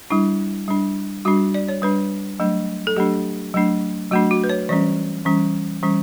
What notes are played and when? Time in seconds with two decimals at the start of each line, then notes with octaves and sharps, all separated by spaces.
0.10 G3 D4 E4
0.68 G3 D4
1.25 G3 D4 F#4
1.54 D5
1.68 C#5
1.82 G3 D4 B4
2.40 F#3 A3 D4
2.87 A4
2.97 F#3 A3 D4 G4
3.54 F#3 A3 D4
4.11 F#3 A3 D4 F#4
4.31 F#4
4.44 B4
4.49 C#5
4.69 E3 G3 C#4 D5
5.25 E3 G3 C#4
5.83 E3 G3 C#4